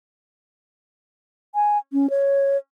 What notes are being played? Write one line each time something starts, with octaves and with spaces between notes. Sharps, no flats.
G#5
C#4
C#5